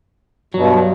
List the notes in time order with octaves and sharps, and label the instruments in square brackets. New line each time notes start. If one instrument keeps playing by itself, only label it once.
[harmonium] G2 B2 [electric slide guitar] F#3